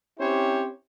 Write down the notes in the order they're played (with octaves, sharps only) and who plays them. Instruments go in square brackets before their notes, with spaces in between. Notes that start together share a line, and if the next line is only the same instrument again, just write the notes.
[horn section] C4 C#4 E4 G4 C5 C#5